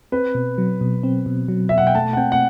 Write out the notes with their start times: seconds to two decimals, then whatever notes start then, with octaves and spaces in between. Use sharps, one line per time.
0.12 C4 B4
0.35 B2
0.58 F#3
0.81 B2
1.03 C4
1.26 B2
1.48 F#3
1.69 B2 E5
1.78 F#5
1.87 G5
1.95 A3 A5
2.13 F#5
2.17 C4 G5
2.32 F#5